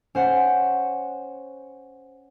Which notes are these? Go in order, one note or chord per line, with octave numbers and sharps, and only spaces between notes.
C#4 C5 F#5